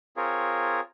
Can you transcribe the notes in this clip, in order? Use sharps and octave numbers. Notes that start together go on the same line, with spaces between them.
C4 F4 G#4 A#4 C#5